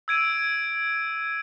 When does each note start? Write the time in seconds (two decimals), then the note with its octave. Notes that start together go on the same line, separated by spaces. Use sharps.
0.08 E6 G#6 D7 D#7